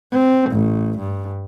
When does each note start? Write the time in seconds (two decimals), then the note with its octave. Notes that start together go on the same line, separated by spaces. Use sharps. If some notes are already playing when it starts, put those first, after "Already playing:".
0.11 C4
0.51 A1
0.98 G2